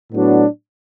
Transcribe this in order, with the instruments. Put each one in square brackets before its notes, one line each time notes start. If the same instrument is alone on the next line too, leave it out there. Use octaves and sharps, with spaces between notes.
[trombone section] A2 F#3 B3 D4 F#4